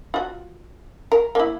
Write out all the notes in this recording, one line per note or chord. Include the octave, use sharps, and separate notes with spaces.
F4 F#4
A#4
A#3 E4